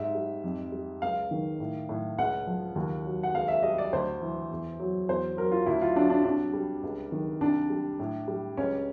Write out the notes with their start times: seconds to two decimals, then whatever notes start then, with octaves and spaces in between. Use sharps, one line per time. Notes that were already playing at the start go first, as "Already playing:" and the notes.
Already playing: G#2 G3 E5
0.15 G3
0.44 F2
0.72 G3
1.02 C#2 F5
1.31 D#3
1.60 A2
1.89 A2
2.18 C#2 F#5
2.47 F3
2.76 D#2
3.05 F#3
3.23 F#5
3.34 C#2 F5
3.48 E5
3.63 G3 D#5
3.78 D5
3.93 D2 C5
4.22 E3
4.51 E2
4.80 F#3
5.09 E2 C5
5.37 F#3 A#4
5.52 F4
5.66 D2 E4
5.82 F4
5.96 F#3 D4
6.10 D4
6.24 C2 D4
6.53 G3
6.83 C#2
7.12 D#3
7.41 C2 D4
7.70 G3
7.99 A2
8.28 G3
8.57 C#2 C#4